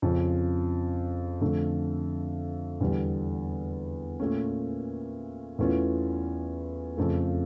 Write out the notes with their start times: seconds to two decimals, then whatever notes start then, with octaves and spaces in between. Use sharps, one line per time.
0.02 F2 C#3 F3 C#4
1.41 F2 D3 A3
2.80 E2 D3 G3
4.20 A#2 A3 C#4
5.58 E2 E3 A3 C#4 F4
6.97 F2 C#3 F3 A3